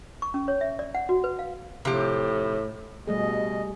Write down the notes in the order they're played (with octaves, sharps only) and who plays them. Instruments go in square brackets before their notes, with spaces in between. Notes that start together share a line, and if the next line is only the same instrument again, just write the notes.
[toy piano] C#6
C#4
C#5
E5
D5
F#5
F#4
B4
F5
[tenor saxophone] A2 [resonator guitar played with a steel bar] C3 F3 G4
[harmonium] B2 D#5 [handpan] G3 A3 G#4